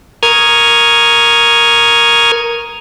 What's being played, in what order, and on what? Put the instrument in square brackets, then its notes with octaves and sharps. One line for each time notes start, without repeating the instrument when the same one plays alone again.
[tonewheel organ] A#4 C#6 D#6 F6 G#6